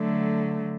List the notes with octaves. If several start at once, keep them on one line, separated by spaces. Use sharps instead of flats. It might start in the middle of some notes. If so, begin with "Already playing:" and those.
Already playing: D3 F#3 A3